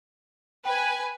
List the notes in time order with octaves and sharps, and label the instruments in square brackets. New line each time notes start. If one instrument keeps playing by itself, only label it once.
[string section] B4 G#5 [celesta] G5